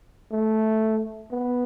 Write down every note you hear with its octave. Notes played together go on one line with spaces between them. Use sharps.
A3
B3